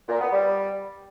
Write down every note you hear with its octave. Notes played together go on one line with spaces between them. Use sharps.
A#2
B3
G3